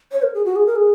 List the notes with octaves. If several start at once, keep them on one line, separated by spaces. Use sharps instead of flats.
C#5
A#4
G#4
F#4
G#4
A#4
G#4